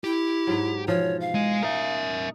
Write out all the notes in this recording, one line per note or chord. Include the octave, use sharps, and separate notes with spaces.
E4 G4
G#2 F#3
B2 E3 F3 C#5
F5
G#3
D#4 A#4 E5